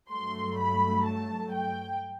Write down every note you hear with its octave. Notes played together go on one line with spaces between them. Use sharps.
G2 F#3 A3 C6
B5
A5
G5